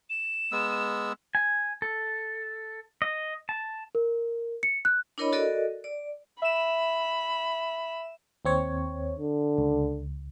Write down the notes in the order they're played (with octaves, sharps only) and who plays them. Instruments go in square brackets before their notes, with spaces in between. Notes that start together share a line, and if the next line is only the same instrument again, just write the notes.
[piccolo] E7
[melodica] G#3 B3 E6
[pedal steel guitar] G#5
A4
D#5
A5
[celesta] A#4
C#7
F#6
[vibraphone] D4 E4 A#4 C#5 D#5 B5
F#4 A4 A#4 D5 D#5
D5
[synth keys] E5 E7 [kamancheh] B5
[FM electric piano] D#2 C4 C#5
[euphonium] D3
[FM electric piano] C#2